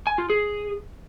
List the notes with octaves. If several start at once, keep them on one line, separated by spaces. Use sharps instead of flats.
G#5
F4
G#4